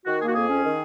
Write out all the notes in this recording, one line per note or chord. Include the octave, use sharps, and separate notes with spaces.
D#3 F#4
A#3 G#4
F#4
F2 G#4
C#4
D#3